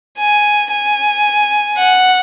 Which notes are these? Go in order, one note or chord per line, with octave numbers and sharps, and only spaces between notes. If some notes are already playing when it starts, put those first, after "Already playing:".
G#5
G#5
F#5